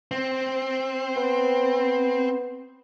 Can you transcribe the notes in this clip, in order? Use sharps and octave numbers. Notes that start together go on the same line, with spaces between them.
C4
B3